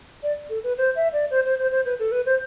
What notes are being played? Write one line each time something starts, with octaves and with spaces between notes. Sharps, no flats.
D5
A4
B4
C5
E5
D5
C5
C5
C5
C5
B4
A4
B4
C5